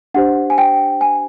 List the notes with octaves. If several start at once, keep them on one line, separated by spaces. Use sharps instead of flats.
D4 G4 C5 F#5
G#5
G5
G#5